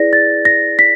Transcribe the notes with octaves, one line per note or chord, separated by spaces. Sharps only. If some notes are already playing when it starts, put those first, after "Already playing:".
Already playing: E4 G#4 B4 D5 A#6
A6
A#6
B6